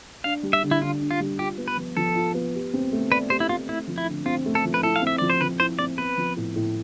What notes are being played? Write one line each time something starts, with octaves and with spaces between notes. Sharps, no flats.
D4 F5
G3
E5
D3
E4
D3 F4
D4
F4
G3
F4 G4
B3
B4
F3
F3 A4
F4
B3
G4
C4
A3
B4 D5
G4 C5
E4
C4 F4
A3 E4
F3
E4
D3
C4 F4
A3
A4
F3
B4
E4 A4
F5
C4 E5
F3 D5
C5
F3 B4
E4 C5
C4 D5
B3 B4
F3
A2
A2